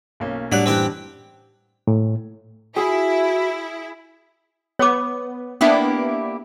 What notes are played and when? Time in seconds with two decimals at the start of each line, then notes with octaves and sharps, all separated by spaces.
0.20 B1 A#3 C#4
0.52 A2 F#3 G3 D4 D5 F#6
0.66 F#1 E3 C4 G4 G5
1.87 A2
2.76 E4 F#4 G#4
4.79 B3 C#5 D6
5.61 A#3 B3 D4 E4 G4